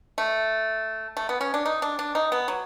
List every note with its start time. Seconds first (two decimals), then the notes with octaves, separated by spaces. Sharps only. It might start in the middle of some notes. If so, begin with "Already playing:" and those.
0.18 A3
1.17 A3
1.29 B3
1.41 C#4
1.54 D4
1.66 D#4
1.82 D4
1.99 D4
2.15 D#4
2.32 B3
2.48 F#3